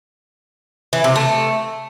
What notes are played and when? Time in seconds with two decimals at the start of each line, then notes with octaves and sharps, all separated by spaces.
0.93 E3
1.04 C3
1.16 A3